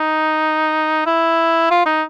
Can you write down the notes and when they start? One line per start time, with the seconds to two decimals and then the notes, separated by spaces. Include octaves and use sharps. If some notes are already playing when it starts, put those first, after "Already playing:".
Already playing: D#4
1.06 E4
1.71 F4
1.86 D#4